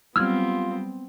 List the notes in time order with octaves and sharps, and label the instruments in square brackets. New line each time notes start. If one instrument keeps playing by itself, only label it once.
[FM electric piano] F#3 G3 [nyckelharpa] B3 C4 [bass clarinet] F4 [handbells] E6 F6 G#6